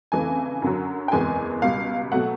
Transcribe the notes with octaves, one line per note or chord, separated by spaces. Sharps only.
F2 C#3 E3 A3 G#5
F#2 D3 F#3
G5
F#1 E2 C3 E3 G#3 G#5
C#2 B2 G3 F5
B2 F#3 A3 F#5